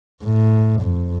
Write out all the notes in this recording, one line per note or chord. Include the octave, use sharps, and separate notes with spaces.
A2
F2